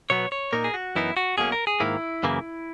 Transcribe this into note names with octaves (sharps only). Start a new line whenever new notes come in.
B2 F#3 B3 C#5
C#5
A#2 A#3 D#4 A#4
G#4
F#4
F#2 E3 B3 D#4 E4
F#4
B1 B2 A#3 C#4 G#4
A#4
G#4
G#2 D#3 A#3 E4
F#2 C#3 E3 A#3